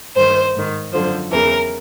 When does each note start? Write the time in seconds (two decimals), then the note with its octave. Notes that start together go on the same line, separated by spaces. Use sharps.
0.16 G2 D#3 C5
0.55 G#2 D#3
0.93 F#2 D3 F3 C5
1.31 E2 C#3 E3 A#4